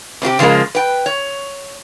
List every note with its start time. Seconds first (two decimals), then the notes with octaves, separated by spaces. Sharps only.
0.22 C3 C4 F#4 G4
0.39 C#3 F3 F#3 G#3 A#3
0.75 B4 G5
1.06 C#5